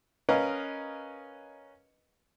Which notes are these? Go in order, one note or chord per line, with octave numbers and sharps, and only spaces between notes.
C#4 A#4 B4 D#5 F5